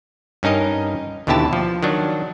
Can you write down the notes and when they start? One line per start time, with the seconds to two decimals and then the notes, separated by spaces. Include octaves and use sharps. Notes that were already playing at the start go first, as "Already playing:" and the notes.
0.43 G2 C#4 D#4 A#4 D#5
1.27 D#2 B2 D3 E4 G4 A5
1.53 F3
1.83 D#3 F#3 D4